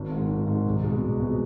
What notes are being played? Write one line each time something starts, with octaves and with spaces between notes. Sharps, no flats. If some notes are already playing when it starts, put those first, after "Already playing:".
Already playing: G#1
G#2 D#3
G#1
G#2
D#3
C2
B2 G#3
C2
B2 G#3